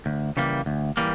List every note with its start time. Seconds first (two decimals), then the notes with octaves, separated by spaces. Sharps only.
0.06 D2
0.37 C#3 E3 G3 A#3
0.66 D2
0.97 E3 G3 A#3